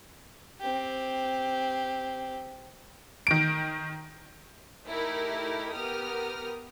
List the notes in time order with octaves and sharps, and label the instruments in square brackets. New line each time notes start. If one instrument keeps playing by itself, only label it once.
[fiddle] C4 G4
[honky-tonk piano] D#3 D7
[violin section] A3 D#4 E4 G4 A#4
B3 G4 A#4 D#6 F6